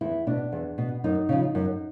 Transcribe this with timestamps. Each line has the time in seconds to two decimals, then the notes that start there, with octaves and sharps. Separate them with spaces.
0.01 E2 E4
0.27 B2 D4
0.52 E2
0.78 B2
1.04 F#2 D#4
1.29 C#3 F3
1.55 F#2